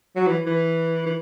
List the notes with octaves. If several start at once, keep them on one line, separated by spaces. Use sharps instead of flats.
F#3
E3
E3
E3